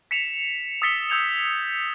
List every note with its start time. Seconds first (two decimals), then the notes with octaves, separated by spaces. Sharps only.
0.11 B6 C#7 E7 F7
0.82 D#6 E6 A6 B6 C#7 G7
1.10 E6 G6 G#6 F7